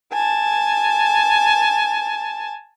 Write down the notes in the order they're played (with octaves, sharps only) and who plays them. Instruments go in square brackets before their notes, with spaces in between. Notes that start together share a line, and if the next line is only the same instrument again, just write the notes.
[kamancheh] G#5 A5